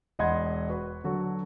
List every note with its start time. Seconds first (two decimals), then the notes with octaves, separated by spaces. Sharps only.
0.19 E1 D#5 F#5 B5 C6 G#6
0.69 F#4 B4
1.04 D3 F#3 F#4 A4